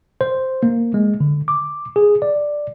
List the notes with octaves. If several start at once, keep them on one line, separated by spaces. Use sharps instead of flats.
C5
A#3
G#3
D3
D6
G#4
D5